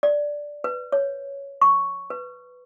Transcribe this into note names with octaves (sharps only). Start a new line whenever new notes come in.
D5
B4
C#5
C#6
B4